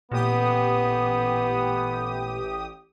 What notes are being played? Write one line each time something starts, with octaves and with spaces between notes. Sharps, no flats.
A1 A#2 B3 G4 D#6